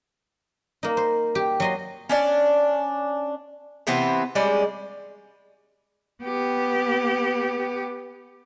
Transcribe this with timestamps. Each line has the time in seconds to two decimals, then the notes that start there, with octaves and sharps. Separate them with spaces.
0.83 A#3 D#4
0.97 C5
1.35 G4
1.60 F#3 D#5 C6
2.09 C#4 D4 D5
3.87 C3 E3 B3 C4
4.35 G3 G#3 C#4 D5
6.23 B3 G4